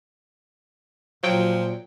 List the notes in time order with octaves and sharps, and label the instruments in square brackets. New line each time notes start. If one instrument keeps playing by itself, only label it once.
[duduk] A#2 [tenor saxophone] F3 [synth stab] F#3 G5